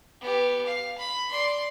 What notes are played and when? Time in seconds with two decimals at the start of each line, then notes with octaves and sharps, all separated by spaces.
0.21 B3 G4
0.66 F5
0.98 B5
1.31 D5 C6